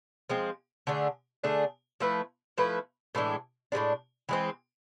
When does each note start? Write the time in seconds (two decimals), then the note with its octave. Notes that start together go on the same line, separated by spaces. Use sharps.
0.29 F3 G#3 C4
0.87 D3 A3 D4 G#4
1.44 D3 A3 D4 G#4
2.00 F3 A3 E4 B4
2.58 F3 A3 E4 B4
3.15 A2 E3 G#3 D4
3.72 A2 E3 G#3 D4
4.29 E3 G#3 C4